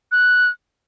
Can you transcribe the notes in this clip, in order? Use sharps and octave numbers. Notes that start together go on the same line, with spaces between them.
F#6